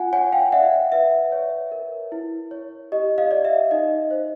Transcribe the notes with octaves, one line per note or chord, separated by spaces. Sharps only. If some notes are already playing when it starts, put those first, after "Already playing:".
Already playing: F4 F#5 G#5
C#5 F#5 G#5
F5 G5
D5 E5 F#5
B4 E5
C#5
A#4
E4
C#5
G4 D#5
D#5 F5
D5
E5
D#4 D#5
C5